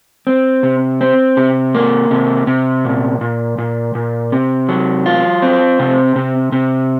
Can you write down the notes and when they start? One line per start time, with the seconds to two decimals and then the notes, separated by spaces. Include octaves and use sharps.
0.27 C4
0.63 C3
1.01 C4
1.37 C3
1.74 A#3
2.11 C3
2.47 C3
2.85 A#2
3.21 A#2
3.58 A#2
3.95 A#2
4.32 C3
4.69 F#3
5.06 F4
5.42 C4
5.79 C3
6.16 C3
6.52 C3